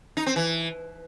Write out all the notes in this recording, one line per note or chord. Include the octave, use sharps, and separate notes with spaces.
D#4
C4
E3